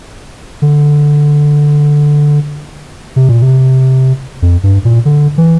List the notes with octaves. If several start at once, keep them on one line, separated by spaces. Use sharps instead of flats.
D3
C3
A#2
C3
F2
G2
A#2
D3
E3